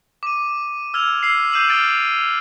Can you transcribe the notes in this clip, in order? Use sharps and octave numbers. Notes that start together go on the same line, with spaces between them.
D6 D#7
E6 F6 G#6 F7
E6 F6 C7
D#6 G6 C7 D#7 E7 F#7
D#6 F6 A6 D7